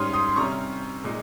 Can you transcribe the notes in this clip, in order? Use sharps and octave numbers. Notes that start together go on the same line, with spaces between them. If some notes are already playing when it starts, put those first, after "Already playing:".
Already playing: G#2 G3 C#4 C6 D#6 F6
C6 D#6
C6
C3 G3 C#4 A#5 C#6
A#2 G#3 D#4